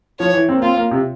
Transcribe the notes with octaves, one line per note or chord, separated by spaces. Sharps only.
F3 C#5
E3
C4
A#3
C4 F4
A#3
C3